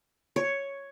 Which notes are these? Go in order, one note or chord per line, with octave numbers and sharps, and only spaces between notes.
C#5